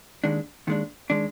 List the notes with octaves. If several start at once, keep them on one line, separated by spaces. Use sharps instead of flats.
D#2 D#3 G#3 D4
D#2 D#3 G#3 D4
D#3 G#3 D4